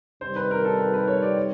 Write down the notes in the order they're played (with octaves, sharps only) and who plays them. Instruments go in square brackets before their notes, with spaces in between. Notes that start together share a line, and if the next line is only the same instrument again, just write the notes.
[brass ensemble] C3 D#3 G3 [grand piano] C5
[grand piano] B4
A#4
A4
B4
B4
C#5
D5
C#5